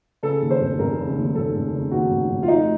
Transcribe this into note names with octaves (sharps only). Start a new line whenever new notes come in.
C#3 A4
D#2
C5
F1
F1 A#4
C#3
D#2
F1 A4
F1
C#3
D#2 F#4
F1
F1
F4
A3 D#4